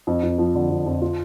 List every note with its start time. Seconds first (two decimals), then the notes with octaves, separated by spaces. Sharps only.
0.07 F2
0.23 F2
0.38 F3
0.55 D3
0.70 F2
0.86 F2
1.02 F4